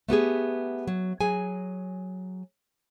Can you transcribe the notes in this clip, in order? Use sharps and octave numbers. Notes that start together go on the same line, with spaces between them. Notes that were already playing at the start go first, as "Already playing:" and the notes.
A3 B3 G4 G#4
F#3
F#3 G#4 G#5